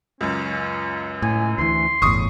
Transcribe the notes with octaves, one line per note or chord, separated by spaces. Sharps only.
C#2 F#2 C#4
A2 G#5
D2 E3 C6
G1 E2 A2 C#6 D#6